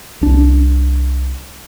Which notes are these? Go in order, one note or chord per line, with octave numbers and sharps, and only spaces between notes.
C2 D4